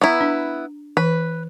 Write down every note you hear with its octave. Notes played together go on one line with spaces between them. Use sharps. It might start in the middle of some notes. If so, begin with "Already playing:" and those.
B3 E4 A#5 C#6
D4
E3 B4